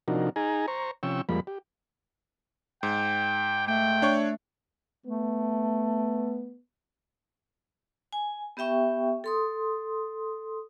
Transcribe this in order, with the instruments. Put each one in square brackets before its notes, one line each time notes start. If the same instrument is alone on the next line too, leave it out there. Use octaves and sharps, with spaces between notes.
[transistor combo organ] C3 F3 D4 D#4 F#4 A#4
D#4 G#4 G#5 A#5
C5 A#5 C#6
C3 F3 C#4 G5 C#6 E6
F2 F3 G3 G#3 A#3 B5
G4
[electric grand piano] G#2 [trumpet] G5
[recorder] A3 [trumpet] G5
[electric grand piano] D4 C#5 C#6
[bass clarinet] A3 [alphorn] B3
[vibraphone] G#5
B3 G4 E5 G5 C#6
A4 C6 D#6